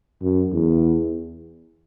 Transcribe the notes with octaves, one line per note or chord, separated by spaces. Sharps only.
F#2
E2